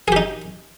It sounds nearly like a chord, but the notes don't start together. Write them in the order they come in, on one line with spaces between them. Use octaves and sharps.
G#4 G4 D#4